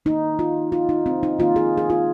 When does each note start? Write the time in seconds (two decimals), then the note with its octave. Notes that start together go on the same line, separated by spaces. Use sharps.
0.05 D#3 A#3 D#4
0.39 F4
0.72 F4
0.89 D#4
1.06 C4
1.23 D#4
1.38 D#3 A#3 F4
1.56 G#4
1.78 G#4
1.90 F4